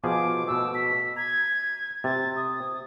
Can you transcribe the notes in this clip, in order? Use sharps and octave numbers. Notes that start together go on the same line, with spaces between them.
B2 F3 G#4 D6
B2 A3 E6
B6
A#5 G#6
C3 A6
D#6